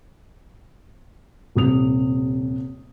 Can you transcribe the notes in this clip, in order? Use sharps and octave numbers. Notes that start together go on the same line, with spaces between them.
D#1 C3 D#6 F7